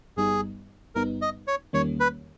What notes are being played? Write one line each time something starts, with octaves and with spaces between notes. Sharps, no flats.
G1 G2 G3 B3 D#4 G#4
G1 G2 G3 B3 D#4 A#4
D#5
C#5
E2 D#3 G3 A#3 C#4 C#5
B4